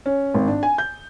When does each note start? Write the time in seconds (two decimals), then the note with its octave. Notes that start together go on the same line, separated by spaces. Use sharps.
0.06 C#4
0.34 G#1
0.47 D4
0.63 G#5
0.78 G6